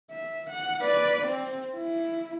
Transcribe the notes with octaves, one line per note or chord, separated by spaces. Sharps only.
E5
F#5
B4 D5
C4
E4